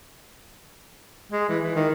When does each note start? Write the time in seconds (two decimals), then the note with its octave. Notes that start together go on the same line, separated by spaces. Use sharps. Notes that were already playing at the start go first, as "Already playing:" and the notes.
1.32 G#3
1.49 E3
1.63 E3
1.75 D#3